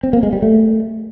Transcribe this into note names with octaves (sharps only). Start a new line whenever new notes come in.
C4
A#3
G#3
G3
A3